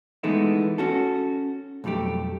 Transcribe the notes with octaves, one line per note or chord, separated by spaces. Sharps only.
E3 G#3 A3 B3 D#4 E4
C#4 F#4 A4
B1 F2 G3 A3 G4